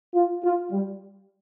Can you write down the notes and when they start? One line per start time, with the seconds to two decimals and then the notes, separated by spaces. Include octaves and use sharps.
0.15 F4
0.44 F4
0.71 G3